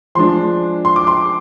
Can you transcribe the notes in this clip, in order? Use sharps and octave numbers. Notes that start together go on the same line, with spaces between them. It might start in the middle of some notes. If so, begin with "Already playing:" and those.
F3 G#3 D4 C6
C6
D6
C6